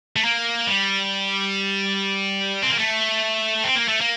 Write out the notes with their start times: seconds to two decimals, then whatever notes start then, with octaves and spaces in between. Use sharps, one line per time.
0.16 A3
0.24 A#3
0.67 G3
2.63 C4
2.70 A#3
2.79 A3
3.64 C4
3.76 A#3
3.88 A3
4.01 A#3